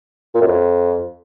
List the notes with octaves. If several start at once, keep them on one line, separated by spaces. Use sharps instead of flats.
A#2
F#2
F2